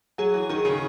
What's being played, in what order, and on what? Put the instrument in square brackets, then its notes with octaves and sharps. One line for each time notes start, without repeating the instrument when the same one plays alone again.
[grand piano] F#3 [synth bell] G#4
[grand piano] E3
[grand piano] D#3 [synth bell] G#4
[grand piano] C#3